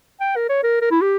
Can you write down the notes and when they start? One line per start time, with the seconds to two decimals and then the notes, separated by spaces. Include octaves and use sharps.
0.20 G5
0.36 A#4
0.49 C#5
0.63 A#4
0.81 A#4
0.91 E4
1.01 G4